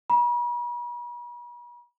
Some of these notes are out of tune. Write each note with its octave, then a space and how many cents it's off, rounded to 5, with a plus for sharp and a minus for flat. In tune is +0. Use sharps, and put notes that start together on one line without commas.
B5 -45